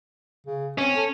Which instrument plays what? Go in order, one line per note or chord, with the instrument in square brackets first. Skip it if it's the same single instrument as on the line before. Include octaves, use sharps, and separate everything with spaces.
[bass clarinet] C#3
[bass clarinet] C4 [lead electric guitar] C#4
[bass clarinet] A4